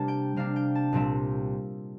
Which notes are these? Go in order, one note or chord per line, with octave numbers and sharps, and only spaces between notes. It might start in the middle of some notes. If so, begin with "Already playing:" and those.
Already playing: C3 G3 A#3 D4 A5
G5
C3 G3 A#3 D4 F5
G5
A5
C2 A#2 G3 C4 E5